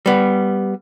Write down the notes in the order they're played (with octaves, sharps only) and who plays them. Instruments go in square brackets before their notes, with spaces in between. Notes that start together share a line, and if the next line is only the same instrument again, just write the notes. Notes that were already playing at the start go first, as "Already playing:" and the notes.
[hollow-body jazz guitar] G3 B3